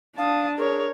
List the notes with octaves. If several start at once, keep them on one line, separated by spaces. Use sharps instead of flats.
D4 F5 A5 D#6
G#4 A#4 C#5